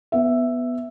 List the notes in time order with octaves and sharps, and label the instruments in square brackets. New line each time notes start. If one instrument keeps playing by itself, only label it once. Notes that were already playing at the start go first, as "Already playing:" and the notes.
[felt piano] B3 E5